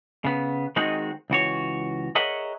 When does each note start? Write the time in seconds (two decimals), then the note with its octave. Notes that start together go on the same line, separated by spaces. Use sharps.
0.25 C#3 B3
0.76 D#3 G#3 C4 D#4 F#4 G#4
1.30 C#2 E3 F#4 C#5
2.15 G#4 A#4 C#5 D#5 E5 F#5